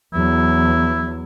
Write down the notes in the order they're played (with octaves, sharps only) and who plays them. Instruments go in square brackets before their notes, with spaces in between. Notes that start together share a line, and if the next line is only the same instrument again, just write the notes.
[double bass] E2 F#3 [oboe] E4